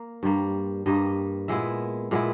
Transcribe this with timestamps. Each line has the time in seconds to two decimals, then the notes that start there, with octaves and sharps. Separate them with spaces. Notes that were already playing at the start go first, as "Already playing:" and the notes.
Already playing: A#3
0.23 G2 G3 A#3
0.86 G2 G3 A#3 D#5
1.48 A#2 G#3 B3 E4 E5
2.11 A#2 G#3 B3 E4